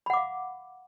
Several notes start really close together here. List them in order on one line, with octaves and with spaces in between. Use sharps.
B5 F#5 D6 F5